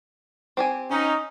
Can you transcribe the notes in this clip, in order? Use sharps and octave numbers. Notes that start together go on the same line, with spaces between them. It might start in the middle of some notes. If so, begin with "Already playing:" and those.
C4 G4 G#5
C#4 D#4